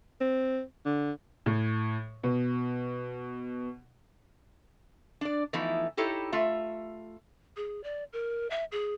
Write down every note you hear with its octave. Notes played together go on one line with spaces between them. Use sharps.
C4
D3
A2
B2
D4 D5
E3 F3 A3 B3 D#4 E4
D#4 E4 G4 A4 C#5
A3 F4 E5
G#4
D5
A#4
E5
G#4